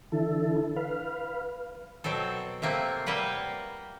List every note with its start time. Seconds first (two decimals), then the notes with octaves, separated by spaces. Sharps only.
0.12 D3 E3 E4 A4
0.76 B4 F5
2.04 B2 F#3 C4 A4
2.62 C3 A3 A#3 C4
3.06 G3 A#3 B4 F#5